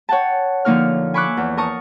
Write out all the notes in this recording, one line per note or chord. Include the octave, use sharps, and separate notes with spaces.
C#5 F#5 G5 A5
D3 F3 A#3 D#4 C#5 F6
G#5 B5 C#6 D6 E6 F#6
E2
A#4 A5 C#6 D#6